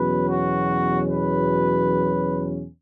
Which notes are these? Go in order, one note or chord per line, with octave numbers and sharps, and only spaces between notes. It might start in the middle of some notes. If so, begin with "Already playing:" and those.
Already playing: E2 B2 F#3 C#4 B4
F#4
B4